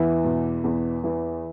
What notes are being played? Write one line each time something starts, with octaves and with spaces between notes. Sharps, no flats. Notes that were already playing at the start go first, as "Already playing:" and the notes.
Already playing: E2 E3 E4
B2
E2
E3